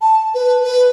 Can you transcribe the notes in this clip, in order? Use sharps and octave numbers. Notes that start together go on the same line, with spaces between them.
A5
B4
B4